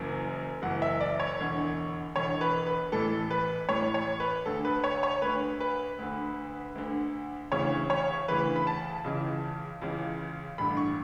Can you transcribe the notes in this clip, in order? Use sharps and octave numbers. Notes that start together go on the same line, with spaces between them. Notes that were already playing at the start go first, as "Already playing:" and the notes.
Already playing: F#1 F#2 E3
F#1 F#2 E3 F#5
E5
D5
C#5
E1 E2 D3
E1 E2 D3 C#5
B4
B4
A1 A2 E3 A4
B4
A1 A2 E3 C#5
C#5
B4
D2 D3 A4
B4
C#5
C#5
D2 D3 B4
B4
D2 D3
D2 D3
D2 C#3 E3 C#5
C#5
D2 C#3 E3 B4
B5
A5
C#2 C#3 E3
C#2 C#3 E3
A1 G2 D3 B5
C#6